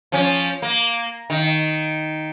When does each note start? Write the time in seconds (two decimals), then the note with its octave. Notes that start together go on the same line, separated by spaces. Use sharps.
0.12 F3 C#4
0.62 A#3
1.30 D#3